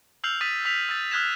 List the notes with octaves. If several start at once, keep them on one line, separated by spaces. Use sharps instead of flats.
E6 F6 G6 C7 F7 F#7
D#6 A6 B6 D#7
E6 B6 F7
E6 G6 A6 D#7
D#6 F6 F#6 G#6 B6 E7